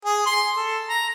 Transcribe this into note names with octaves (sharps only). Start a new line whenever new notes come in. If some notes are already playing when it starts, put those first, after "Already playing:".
G#4
C6
A4
A#5